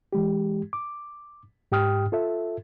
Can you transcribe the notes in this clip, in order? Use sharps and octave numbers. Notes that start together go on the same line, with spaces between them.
E3 G#3 G4
D6
G#2 G4 G5 D#6 F6
F4 A4 E5